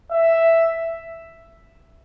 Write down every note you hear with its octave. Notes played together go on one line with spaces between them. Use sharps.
E5